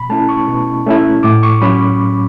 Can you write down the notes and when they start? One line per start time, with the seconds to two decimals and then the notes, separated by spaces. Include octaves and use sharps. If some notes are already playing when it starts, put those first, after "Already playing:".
Already playing: B2 B5
0.10 A3 C#4 E4 A5
0.29 C#6
0.48 B2
0.86 A3 C#4 E4
1.23 A2 D6
1.43 C#6
1.62 F#3 C#4 B5